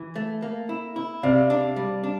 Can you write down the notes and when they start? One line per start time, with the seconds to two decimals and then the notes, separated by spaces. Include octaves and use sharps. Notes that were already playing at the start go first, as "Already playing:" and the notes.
Already playing: E3
0.16 A3
0.42 A#3
0.69 E4
0.96 E4
1.23 C3 D5 F5
1.50 D4
1.76 G3
2.04 D4